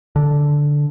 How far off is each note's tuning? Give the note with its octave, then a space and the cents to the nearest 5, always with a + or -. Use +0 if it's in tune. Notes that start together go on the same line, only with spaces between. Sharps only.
D3 -5